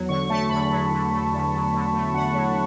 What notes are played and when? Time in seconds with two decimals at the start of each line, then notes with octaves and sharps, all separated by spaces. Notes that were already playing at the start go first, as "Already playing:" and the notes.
Already playing: E2 F#3
0.09 D3 C#6
0.29 A3 A5
0.50 E2 B5
0.70 F#3
0.91 D3
1.12 A3
1.32 E2
1.53 F#3
1.73 D3
1.94 A3
2.14 E2 F#5
2.34 F#3